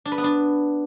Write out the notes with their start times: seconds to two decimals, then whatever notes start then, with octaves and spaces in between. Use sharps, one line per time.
0.05 D4
0.12 B4
0.18 B3
0.24 D4